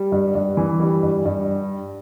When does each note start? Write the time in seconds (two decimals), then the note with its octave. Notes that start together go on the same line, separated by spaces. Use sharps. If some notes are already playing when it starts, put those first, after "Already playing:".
Already playing: G3
0.12 G2
0.35 G2
0.57 E3
0.80 G3
1.03 G2
1.25 G2